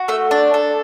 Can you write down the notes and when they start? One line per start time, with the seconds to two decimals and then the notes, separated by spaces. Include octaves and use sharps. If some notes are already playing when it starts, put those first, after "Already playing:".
Already playing: F#4
0.08 A3 E5
0.31 D4 D5
0.54 A4